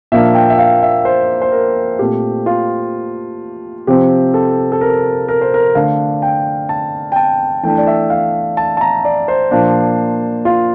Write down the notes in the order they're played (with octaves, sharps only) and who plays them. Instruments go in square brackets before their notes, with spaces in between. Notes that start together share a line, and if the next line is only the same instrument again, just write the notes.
[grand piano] A#2 F3 A#3 D4 E5
G5
E5
F5
E5
C5
C5
A#4
A#2 A3 C4 G4
F4
C3 F3 C4 G4
A4
A4
A#4
A#4
C5
A#4
D3 A3 D4 F5
G5
A5
G5
A5
E3 A3 D4 G5
D5
E5
F5
A5
A5
A#5
D5
C5
A#2 F3 A#3 D4
F4